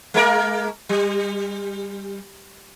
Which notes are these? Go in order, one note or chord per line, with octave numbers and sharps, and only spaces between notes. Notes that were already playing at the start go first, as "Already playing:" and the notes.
G#3 A#3 A#4
G3